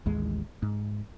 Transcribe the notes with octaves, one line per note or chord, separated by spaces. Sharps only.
A1 D#2 G#3
G#2